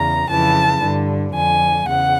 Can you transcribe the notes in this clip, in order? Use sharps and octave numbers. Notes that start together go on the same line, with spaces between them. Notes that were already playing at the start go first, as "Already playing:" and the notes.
Already playing: E2 C#3 A#5
F2 C#3 E3 A5
G2 D3
F2 D3 G#5
E2 C#3 F#5